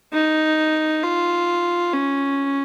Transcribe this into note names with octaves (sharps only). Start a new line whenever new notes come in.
D#4
F4
C#4